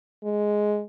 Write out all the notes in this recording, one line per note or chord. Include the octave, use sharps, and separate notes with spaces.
G#3